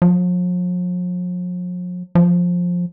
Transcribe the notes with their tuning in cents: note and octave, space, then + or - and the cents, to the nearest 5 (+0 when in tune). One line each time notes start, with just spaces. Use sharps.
F3 +45
F3 +15